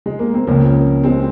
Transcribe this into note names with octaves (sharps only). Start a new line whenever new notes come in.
G#3
A#3
C4
C#2 C#3 F3 A#3 C#4
G#3 C4